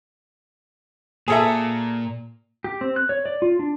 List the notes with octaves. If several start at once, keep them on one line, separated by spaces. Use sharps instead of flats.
A#2 G#4 A4 E5
G4
C4
F#6
C#5
D5
F4
D4